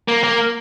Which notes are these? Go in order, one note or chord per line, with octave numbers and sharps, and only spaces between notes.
A#3
A#3